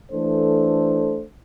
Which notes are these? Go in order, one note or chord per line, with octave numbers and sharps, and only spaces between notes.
E3 A3 D4 A4 C5